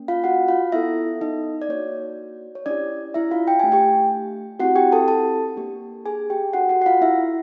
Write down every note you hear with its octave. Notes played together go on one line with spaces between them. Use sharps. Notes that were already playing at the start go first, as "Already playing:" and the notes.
Already playing: A#3 C#4
F4 F5
F#4 F#5
F4 F5
B3 E4 A4 E5
D#4 D#5
D5
A#3 D4 F#4 C#5
C#5
C#4 D4 E4 G4 D5
E4 E5
F4 F5
G5
A3 D4 G4 G#5
G4 G5
C4 E4 F#4 G4 F#5
G4 G5
A4 A5
A4 A5
A#3 D4 G4
G#4 G#5
G4 G5
D4 F#4 A4 F#5
F#4 F#5
F#5
F4 F5
E4 E5